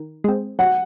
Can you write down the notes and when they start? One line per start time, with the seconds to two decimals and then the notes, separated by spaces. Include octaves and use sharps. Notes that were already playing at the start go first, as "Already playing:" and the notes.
Already playing: D#3
0.24 G#3 C4
0.59 F#3 F#5